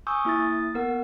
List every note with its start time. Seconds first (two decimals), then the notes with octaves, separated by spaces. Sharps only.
0.07 G#5 C#6 D#6 E6 G6
0.25 A#3 E4 D#6 A6
0.74 B3 A#4 F#5